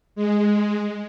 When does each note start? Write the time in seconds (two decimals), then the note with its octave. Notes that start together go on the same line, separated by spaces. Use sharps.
0.16 G#3